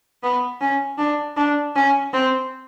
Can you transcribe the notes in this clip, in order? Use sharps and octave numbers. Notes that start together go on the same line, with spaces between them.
B3
C#4
D4
D4
C#4
C4